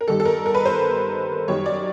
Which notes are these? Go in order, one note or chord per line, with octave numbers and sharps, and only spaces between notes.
A#4
G2 D#3 G3 A4
A4
A#4
A#4
B4
C5
F#2 D#3 G3 C#5
D5